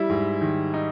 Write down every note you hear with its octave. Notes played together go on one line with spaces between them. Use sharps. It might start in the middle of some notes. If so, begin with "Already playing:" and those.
Already playing: G3 E4
G#2
D#3
D#4